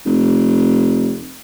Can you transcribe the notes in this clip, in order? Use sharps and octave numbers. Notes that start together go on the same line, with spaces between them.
F1